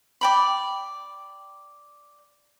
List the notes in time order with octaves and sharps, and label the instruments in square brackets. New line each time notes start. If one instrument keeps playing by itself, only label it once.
[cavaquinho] D5 G5 B5